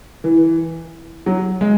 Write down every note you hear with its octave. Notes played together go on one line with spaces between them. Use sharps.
E3
F#3
G#3